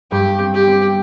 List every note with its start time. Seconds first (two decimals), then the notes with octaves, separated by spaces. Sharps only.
0.11 G2 G4
0.39 C4
0.54 G4
0.68 C4